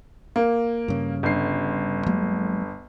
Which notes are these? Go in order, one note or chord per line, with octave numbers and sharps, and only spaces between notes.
A#3
G2 C#3
G1 D3 C7
F#3 G#3 A#3